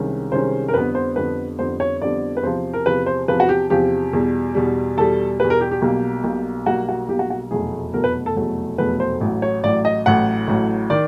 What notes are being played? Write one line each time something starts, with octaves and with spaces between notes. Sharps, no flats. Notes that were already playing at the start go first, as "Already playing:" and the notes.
Already playing: C2 C3 D#3 G#3 C#4
C2 C3 D#3 G#3 C#4 C5
A#4
F2 D3 G3 B3 B4
C5
F2 D3 G3 B3 B4
F2 D3 G3 B3 C5
C#5
F2 D3 G3 B3 D5
B4
E2 C3 F3 C5
A#4
E2 C3 F3 B4
C5
E2 C3 F3 B4
F#4
G4
E2 C3 F3 G4
E2 B2 G3
E2 B2 G3
E2 B2 G3 A4
E2 B2 G3 B4
A#4
G4
G4
B1 B2 G3 A#3
B1 B2 G3 A#3
B1 B2 G3 A#3 F#4
F#4
B1 B2 G3 A#3 G4
F#4
F#4
F1 E2 B2 F#3 A3 G#4
F1 E2 B2 F#3 A3 A#4
B4
A4
F1 E2 B2 F#3 A3
F1 E2 B2 F#3 A3 B4
C5
A1 A2 F#3
C#5
A1 A2 F#3 D5
D#5
A1 A2 F#3 F#5
A1 A2 F#3
D#3 D5